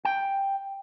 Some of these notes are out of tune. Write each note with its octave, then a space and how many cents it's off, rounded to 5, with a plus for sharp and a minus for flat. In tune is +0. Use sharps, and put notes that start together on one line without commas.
G5 +5